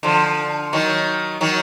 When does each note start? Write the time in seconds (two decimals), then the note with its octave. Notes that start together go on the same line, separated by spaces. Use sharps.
0.03 D3 F3
0.73 D#3 F#3
1.41 D#3 F#3